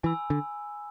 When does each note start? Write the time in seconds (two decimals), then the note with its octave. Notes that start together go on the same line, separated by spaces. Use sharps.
0.03 E3 G#5 B5 E6
0.30 D3